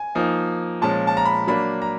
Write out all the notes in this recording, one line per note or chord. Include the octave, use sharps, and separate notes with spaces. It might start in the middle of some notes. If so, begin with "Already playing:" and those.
Already playing: G#5
F3 A#3 D#4
A#2 F3 G#3 C#4 A5
A5
A#5
B5
F#3 A#3 D4 B5
A#5